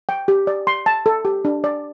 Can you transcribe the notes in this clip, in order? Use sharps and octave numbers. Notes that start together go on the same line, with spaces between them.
G5
G4
D5
C6
A5
A4
G4
D4
D5